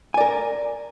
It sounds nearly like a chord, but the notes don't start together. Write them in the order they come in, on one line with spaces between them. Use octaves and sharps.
G#5 D5 A#4